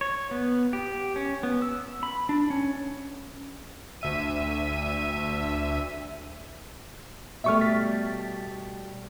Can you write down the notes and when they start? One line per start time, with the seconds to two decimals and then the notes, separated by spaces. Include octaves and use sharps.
0.01 C#5
0.31 B3
0.73 G4
1.16 C#4
1.43 B3
1.62 E6
2.03 B5
2.29 D4
2.50 C#4
4.01 D2 E5 D#7
7.44 B2 G3 A3 E5 C#6 F6
7.60 A6 B6